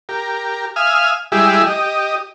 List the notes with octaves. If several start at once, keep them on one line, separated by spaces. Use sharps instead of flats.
G4 A#4
E5 F5 G#5 D#6 F6
G3 G#3 E4 G4 G#4 E5
G4 D#5